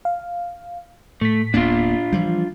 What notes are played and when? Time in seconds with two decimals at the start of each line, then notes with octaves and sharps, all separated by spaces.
0.05 F5
1.21 A2 A3 B6
1.54 D1 A#3 B3 D4 F4
2.13 E3 F3 G3